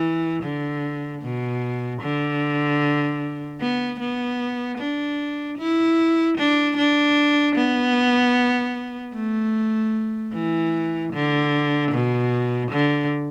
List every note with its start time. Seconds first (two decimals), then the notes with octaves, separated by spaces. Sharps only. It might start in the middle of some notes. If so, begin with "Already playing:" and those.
Already playing: E3
0.43 D3
1.22 B2
2.02 D3
3.60 B3
4.00 B3
4.78 D4
5.58 E4
6.38 D4
6.77 D4
7.56 B3
9.14 A3
10.33 E3
11.13 D3
11.92 B2
12.71 D3